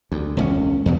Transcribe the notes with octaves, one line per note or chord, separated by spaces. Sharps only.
D2
E1 C#2 C#4
E2 G2 B2